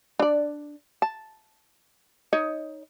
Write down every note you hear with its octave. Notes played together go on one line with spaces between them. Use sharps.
D4 D5
A5
D#4 C#5 D#5